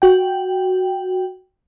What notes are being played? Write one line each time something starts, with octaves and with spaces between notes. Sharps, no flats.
F#4 G5